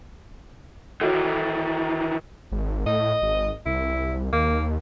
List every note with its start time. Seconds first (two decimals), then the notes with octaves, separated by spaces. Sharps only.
1.01 D#3 E3 E4 F#4 A4
2.52 G#1
2.86 A2 D#5
3.22 G#1
3.66 C2 E4
4.32 D#2 A#3